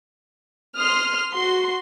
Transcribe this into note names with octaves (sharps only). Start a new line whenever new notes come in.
C6 D#6 F6
F#4 C6